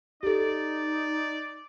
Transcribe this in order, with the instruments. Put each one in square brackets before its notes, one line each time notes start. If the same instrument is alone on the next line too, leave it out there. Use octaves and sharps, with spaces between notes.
[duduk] D#4 [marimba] G4 A4 [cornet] D5